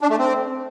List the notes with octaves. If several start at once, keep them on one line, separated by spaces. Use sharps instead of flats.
D4
A3
C4